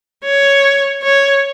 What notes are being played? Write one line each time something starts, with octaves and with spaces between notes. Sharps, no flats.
C#5
C#5